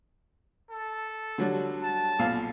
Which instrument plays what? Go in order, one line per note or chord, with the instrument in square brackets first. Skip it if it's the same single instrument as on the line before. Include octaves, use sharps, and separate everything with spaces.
[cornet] A4
[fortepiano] D3 F#3 G3
[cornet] A5
[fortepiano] B1 A#2 F5